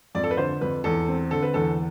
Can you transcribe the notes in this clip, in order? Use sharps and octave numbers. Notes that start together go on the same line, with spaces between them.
F2 D5
A4
B4
D3 C5
F2 B4
E2 A4
C4
D3 A4
B4
E2 A4